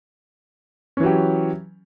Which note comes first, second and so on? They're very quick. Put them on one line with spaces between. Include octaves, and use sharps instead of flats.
C#4 E3 F#3 G4